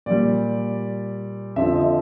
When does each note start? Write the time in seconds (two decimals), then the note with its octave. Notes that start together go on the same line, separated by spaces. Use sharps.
0.06 A#2 G3 D5
1.56 F2 D3 F3 E5
1.75 D#5